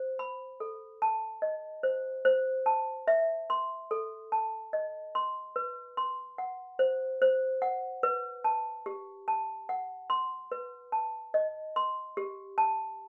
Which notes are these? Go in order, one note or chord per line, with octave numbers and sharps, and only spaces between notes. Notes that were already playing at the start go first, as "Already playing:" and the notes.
Already playing: C5
B5
A4
A5
D#5
C5
C5
A5
E5
C6
A4
A5
D#5
C6
B4
C6
F#5
C5
C5
F#5
B4
A5
G4
A5
F#5
C6
B4
A5
D#5
C6
G4
A5